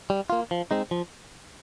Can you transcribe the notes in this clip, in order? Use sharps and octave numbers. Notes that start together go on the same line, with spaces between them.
G3
A#3 F4
F3
G#3 C4 D#4
F3